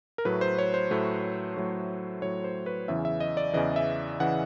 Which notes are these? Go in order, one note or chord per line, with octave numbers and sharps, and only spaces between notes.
A#4
A2 F#3 A3 B4
C5
C#5
C5
A2 F#3 A3
A2 F#3 A3
A2 F#3 A3 C#5
C5
B4
E2 C#3 E3 E5
E5
D#5
D5
E2 C#3 E3 D#5
E5
C#3 E3 F#5